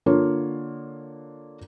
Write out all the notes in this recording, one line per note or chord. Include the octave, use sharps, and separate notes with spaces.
D3 A#3 F4 C#5